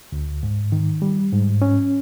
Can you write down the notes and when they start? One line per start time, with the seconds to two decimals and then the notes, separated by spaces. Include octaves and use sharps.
0.12 D2
0.43 G#2
0.72 D#3
1.02 G3
1.32 G#2
1.62 C#4